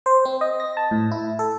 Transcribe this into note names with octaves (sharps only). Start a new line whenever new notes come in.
C5
C4
D#5
A#6
A5
A2
E4
A4